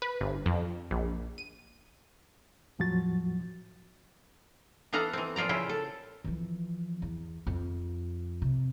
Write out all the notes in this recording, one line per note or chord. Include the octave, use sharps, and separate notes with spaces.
B4
G1
F2
A#1
D#7
E2 A2 F3 F#3 F#4 A6
E3 B3 A4 F5 F#5 A#5
E3 C4
A#2 F3 F4 D5 A#5
C#3 E4 F4 G5
A4
E3 F3
E2
F2
C3